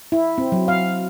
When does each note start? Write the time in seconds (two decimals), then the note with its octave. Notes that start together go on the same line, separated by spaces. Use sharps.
0.12 E4
0.38 C4
0.52 F#3
0.68 F5